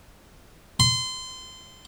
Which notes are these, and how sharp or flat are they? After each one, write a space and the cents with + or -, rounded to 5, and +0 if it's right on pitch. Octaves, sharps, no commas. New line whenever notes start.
C6 -25